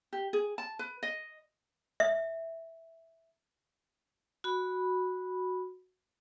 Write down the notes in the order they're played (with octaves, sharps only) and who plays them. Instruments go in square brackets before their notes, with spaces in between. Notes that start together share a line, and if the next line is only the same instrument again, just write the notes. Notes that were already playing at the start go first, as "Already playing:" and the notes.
[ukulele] G4
G#4
A5
B4
D#5
[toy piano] E5
[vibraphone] F#4 B5